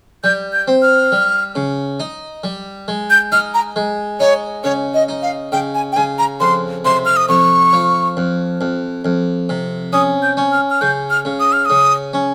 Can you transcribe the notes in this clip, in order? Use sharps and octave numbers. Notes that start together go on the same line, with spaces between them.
G3 G6
G6
C4
F6
G3
C#3
D#4
G3
G#3
G6
D#4 F6
A#5
G#3
D#4 C#5
C#3 C#5
D#5
D#4
F5
C#3 G5
G#5
G5
C#3 G#5
A#5
F2 C6
C3 C6
F6
D#6
F2 C#6
F3
F2
F2
F2
C3
C#4 D#6
G6
C#4
F6
F6
C#3 G6
F6
C#3
D#6
F6
C#3 D#6
C#4